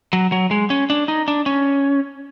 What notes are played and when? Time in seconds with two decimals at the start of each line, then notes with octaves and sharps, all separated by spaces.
0.13 F#3
0.32 F#3
0.51 G#3
0.70 C#4
0.90 D4
1.08 D#4
1.28 D4
1.46 C#4